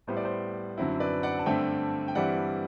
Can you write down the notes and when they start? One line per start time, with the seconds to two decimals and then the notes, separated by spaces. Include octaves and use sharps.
0.07 A2 G3 B3 E4 C5
0.17 D5
0.25 C5
0.78 F#2 D3 F#3 C4 E4
1.00 B4 D5
1.23 D5 F#5
1.39 A5
1.46 G2 D3 A3 C4 E5 G5
2.08 G5
2.15 G2 E3 G3 C4 E4 D5 F#5